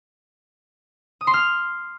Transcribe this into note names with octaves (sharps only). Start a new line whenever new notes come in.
D#6
C6
F6